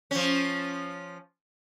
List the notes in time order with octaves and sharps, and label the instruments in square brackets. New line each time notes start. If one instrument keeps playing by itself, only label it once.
[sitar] F3 C#4